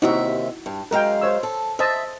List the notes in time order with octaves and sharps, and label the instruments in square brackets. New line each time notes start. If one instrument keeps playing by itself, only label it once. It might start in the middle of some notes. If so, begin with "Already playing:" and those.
[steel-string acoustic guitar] D#2 C3 E5 [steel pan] D#4 E4 F#4
[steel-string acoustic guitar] G2
[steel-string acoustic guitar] F#2 G#3 F5 [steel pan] A#4 G5
[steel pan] C5 C#5 E6
[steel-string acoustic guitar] A4
[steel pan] C5 D#5 A5 [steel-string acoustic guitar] E5